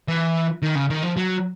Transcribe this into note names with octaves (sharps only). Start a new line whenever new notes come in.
E3
D#3
C#3
D#3
F3
F#3